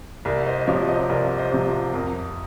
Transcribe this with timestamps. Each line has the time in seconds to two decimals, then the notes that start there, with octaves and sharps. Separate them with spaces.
0.25 C2 A#4
0.46 C5 D#5
0.61 D#5
0.67 C3 F3 C#5 F5
0.88 C5 D#5
1.09 C2 A#4 C#5
1.37 C5 D#5
1.52 C3 F3
1.94 F2 A#4